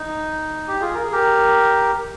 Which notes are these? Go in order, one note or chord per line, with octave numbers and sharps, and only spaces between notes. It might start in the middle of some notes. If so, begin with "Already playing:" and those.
Already playing: D#4
G4
F4 G#4
A#4
G#4
G4 A#4